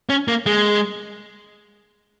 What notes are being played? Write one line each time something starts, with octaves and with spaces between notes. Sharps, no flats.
C#4
A#3
G#3